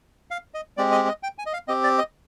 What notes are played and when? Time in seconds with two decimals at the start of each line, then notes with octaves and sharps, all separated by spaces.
0.31 F5
0.54 D#5
0.77 G#3 C4 G4 D5
0.92 D#5
1.08 D#5
1.23 G5
1.38 G#5
1.46 D#5
1.53 F5
1.68 C4 G4 D#5
1.84 D5
1.98 D#5